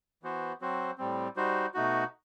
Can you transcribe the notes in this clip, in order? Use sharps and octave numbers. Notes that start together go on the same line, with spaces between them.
E3 B3 F#4 C5
F#3 C4 F#4 C5
A2 G3 C4
G3 D#4 F#4 C5
B2 A3 D#4 F#4